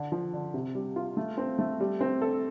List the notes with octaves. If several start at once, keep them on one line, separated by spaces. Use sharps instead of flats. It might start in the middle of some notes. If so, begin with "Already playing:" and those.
Already playing: D3
F3
D3
C3
G3
F4
A3
C4
A3
G3
C4
A4